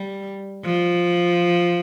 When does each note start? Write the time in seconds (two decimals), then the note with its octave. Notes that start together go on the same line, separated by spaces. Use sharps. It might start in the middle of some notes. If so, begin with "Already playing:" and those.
Already playing: G3
0.64 F3